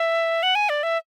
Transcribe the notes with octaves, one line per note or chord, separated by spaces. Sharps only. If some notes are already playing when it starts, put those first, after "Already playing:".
Already playing: E5
F#5
G#5
D5
E5